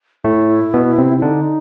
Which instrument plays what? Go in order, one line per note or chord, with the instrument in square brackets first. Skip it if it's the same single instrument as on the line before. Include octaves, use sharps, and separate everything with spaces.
[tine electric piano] A2 A3 [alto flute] E4
[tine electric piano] B2 B3
C3 C4
[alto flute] E4
[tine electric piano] D3 D4 [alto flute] D#4